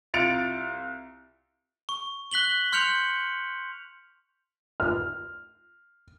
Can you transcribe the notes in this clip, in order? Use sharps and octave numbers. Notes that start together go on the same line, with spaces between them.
C2 F4 A6 C#7 D7 F7
C#6
F#6 B6 F#7 G7
C6 F6 G6 C#7 F7 F#7
F6